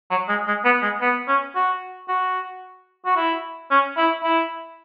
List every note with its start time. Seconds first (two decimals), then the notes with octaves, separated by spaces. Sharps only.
0.10 F#3
0.29 G#3
0.47 G#3
0.65 B3
0.82 G#3
1.01 B3
1.28 C#4
1.55 F#4
2.08 F#4
3.05 F#4
3.16 E4
3.71 C#4
3.97 E4
4.23 E4